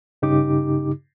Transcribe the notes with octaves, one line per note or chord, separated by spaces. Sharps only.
G2 C#3 D#4 G4 D6